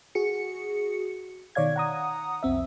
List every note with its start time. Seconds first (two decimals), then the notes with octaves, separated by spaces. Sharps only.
0.15 F#4 G#4 C#7
1.55 B2 D#3 C#5 D5 F5 G#6
1.76 F#5 A#5 D#6
2.43 B1 F2 C4 E5